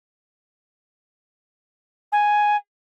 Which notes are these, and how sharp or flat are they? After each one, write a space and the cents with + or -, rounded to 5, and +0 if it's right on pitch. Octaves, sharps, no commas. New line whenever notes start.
G#5 +0